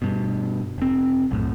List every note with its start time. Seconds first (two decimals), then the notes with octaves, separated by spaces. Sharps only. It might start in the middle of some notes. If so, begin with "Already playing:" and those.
0.02 G2 B2
0.78 F1 C4
1.31 B1 F#2 A2